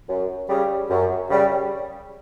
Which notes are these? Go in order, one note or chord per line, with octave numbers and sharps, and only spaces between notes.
F#2
C#3 G3
F#2
C#3 G3